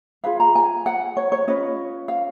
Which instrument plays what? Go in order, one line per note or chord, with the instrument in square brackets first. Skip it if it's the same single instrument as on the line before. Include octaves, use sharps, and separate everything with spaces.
[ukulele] F4 G#4 B4 F5
A#5
G#5
F#5
C#5
C#5
C#4 F4 B4 D#5
F5